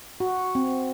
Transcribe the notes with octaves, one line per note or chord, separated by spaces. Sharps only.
F#4
C4